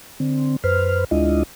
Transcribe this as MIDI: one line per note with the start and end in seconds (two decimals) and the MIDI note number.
0.20 0.56 50
0.20 0.56 60
0.64 1.04 42
0.64 1.04 71
0.64 1.04 72
0.64 1.04 89
1.11 1.43 38
1.11 1.43 56
1.11 1.43 62
1.11 1.43 64
1.11 1.43 65
1.11 1.43 75